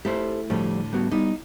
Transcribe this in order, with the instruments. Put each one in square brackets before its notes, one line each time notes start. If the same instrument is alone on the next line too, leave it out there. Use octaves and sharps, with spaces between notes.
[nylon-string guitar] A3 E4 [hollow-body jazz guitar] G4 A4 C5
[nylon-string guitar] A2 D3 [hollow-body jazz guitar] F3 G3 A3
[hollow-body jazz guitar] G3 B3 F#4
[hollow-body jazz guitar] G3 B3 [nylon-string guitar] D#4